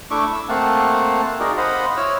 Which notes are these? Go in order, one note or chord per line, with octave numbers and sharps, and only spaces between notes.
A3 D4 E4 E5 C#6 D6
E6
A3 A#3 C4 F5 F#5 A5
D#4 F#4 G#4 A#4 D5
C5 D#5 F5 F#5 B5
E4 C#5 E6 F6